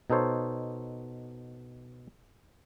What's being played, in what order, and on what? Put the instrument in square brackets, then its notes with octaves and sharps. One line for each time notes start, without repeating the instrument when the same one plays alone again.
[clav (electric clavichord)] B2 D#4 A4 C5 C#5